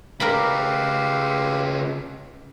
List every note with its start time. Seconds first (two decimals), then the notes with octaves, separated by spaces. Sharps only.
0.20 C#3 G4 A#4 B4 D5 E5 F5 B5